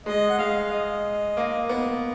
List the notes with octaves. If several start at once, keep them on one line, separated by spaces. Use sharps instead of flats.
G#3 D#5
F#5
G#3 F5
D#5
A#3
B3